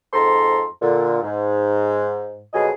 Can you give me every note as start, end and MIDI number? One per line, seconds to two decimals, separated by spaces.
0.14 0.65 41
0.14 0.65 44
0.14 0.65 69
0.14 0.65 82
0.14 0.65 84
0.82 1.18 46
0.82 1.18 50
1.22 2.44 44
2.53 2.70 41
2.53 2.70 47
2.53 2.70 54
2.53 2.70 68
2.53 2.70 75
2.53 2.70 80